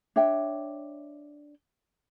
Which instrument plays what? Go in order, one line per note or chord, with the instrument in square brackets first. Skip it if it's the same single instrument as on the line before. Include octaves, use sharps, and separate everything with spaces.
[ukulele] D4 C#5 E5 G5